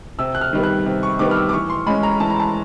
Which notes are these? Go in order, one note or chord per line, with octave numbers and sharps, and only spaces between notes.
C3 E6
F#6
F6
D#3 G3 B3
F#6
C3
C#6
D#3 G3 B3 D6
F6
E6
D6
E3 C#6
C6
G#3 C#4 B5
A#5
E3 A5
A#5
A5